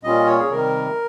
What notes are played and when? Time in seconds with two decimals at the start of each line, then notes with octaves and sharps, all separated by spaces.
0.03 A#2 G3 C#4 F4 D#5
0.27 C#5
0.38 G#4
0.50 C3 D#3 G3 A#4